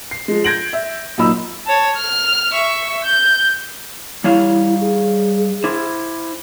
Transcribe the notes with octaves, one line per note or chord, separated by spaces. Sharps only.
C7
F3 G#3
G6 G#6 A#6 D7 F#7
E5
F#2 A#2 A#3 D#4 B5 E6
C#5 A5
F6
E5 C#6
G6
G3 E4 C#5 F5
G#4
E4 C5